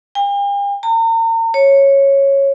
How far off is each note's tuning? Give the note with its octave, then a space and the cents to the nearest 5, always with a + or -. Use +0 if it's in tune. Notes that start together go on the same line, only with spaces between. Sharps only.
G5 +45
A#5 -40
C#5 -10